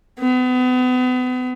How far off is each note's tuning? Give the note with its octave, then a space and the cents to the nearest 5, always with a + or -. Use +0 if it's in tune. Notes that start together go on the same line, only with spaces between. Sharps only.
B3 +35